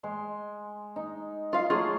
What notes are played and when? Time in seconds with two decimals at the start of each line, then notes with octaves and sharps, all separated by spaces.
0.03 G#3 C6
0.96 D#4
1.53 F4 F5
1.70 F#3 A3 F4 G#4